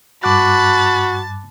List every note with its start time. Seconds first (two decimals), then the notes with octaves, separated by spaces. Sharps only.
0.24 G2 F#4 A5 B5 D6 F#6 A6